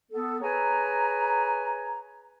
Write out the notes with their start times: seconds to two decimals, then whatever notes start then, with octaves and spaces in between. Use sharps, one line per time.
0.12 B3 A4
0.42 G#4 B4 C#5 G#5 A#5